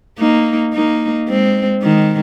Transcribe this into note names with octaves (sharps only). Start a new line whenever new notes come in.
A#3 D#4
A#3 D#4
G#3 C4
D#3 G#3